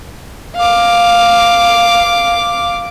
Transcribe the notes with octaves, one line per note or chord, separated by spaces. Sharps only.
F5 D6